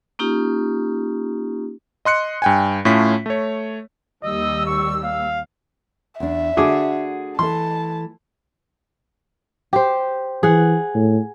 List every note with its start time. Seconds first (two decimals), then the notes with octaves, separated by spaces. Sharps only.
0.19 A#3 C#4 D#4 F4 G4
2.05 D#5 C6 F#6 C#7
2.42 G2 G5 G#5
2.85 A2 A3 C#4 F4 B6
3.26 A3 C#5
4.24 D#2 G3 D#5 E6
4.66 C#6
5.03 F5
6.20 E2 D4 E5
6.57 D3 A3 D4 F#4 G#4 D6
7.39 E3 A3 A4 A5 C6
9.73 G4 C5
10.43 E3 G#4 F#5
10.94 A2